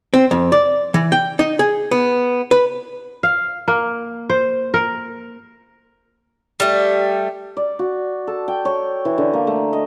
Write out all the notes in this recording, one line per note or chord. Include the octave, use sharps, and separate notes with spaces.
C4
F2
D5
E3
G5
D#4
G#4
B3
B4
F5
A#3
C5
A#4
G3 A3
D5
F#4
A4
G5
C#5
E3
D3
A#3
A3
D#5